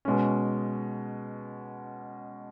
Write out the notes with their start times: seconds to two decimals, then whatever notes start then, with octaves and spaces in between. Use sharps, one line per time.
0.05 B2 G#3 C#4